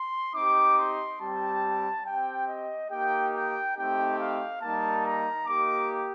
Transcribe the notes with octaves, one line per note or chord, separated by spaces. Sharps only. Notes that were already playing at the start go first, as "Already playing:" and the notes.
Already playing: C6
C4 D#4 G4 D6
C6
G3 C4 G4 A5
C4 G4 G5
D#5
A#3 D#4 G4 G5
G5
A3 C4 D#4 G4 G5
F5
G3 A#3 D#4 A5
A#5
A#3 D#4 G4 D6